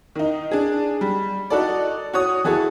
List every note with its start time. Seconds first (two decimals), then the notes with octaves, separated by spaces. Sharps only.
0.15 D#3 D#4
0.51 D4 G#4
1.01 G3
1.50 D#4 F#4 A4 D5
2.13 F#4 C#5 D#6
2.44 E3 F#4 G#4 A4